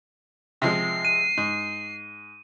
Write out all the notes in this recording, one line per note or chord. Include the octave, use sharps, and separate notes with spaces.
C3 F3 G#3 C7
D#7
G#2